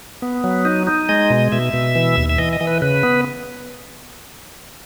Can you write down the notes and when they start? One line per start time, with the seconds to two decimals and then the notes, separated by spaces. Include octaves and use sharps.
0.22 B3
0.44 F#3
0.65 D#4
0.87 D#4
1.09 G#3 D#5
1.30 B2
1.52 B2 E5
1.73 B2
1.95 E3
2.17 D#2
2.29 E5
2.38 E3 D#5
2.53 D#5
2.61 E3
2.67 B4
2.82 C#3 B4
3.03 B3